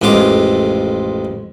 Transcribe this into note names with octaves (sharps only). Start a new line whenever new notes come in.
A1 F2 G#3 F4 D6